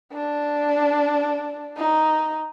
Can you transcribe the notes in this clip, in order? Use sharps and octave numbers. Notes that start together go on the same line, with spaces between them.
D4
D#4